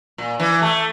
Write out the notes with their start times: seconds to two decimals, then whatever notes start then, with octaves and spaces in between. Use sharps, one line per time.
0.18 A#2
0.40 E3
0.62 A3